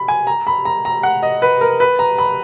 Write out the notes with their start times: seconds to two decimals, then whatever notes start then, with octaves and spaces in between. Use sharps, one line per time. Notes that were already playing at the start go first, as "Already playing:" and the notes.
Already playing: B5
0.08 G#5
0.27 A#5
0.47 B5
0.65 A#5
0.85 A#5
1.03 F#5
1.23 D#5
1.42 B4
1.61 A#4
1.80 B4
1.99 A#5
2.18 B5